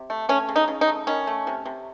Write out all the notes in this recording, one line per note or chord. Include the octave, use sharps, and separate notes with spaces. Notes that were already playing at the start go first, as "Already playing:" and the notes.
Already playing: C3
A3
A3 C#4
C#3
D#4
C#3
D#4
A3
D#3 C#4
A3
C3
C3